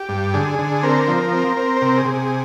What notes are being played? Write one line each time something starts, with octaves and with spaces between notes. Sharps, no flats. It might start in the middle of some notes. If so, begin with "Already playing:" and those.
Already playing: G4
G2
D3 G#4
D3
C4 A#4
F3
C4
C4
C5
C3 A#4
G#4
C3
G#4